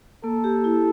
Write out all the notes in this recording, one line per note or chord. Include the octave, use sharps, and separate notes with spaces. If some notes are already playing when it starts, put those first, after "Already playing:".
A#3 A4
G4
E4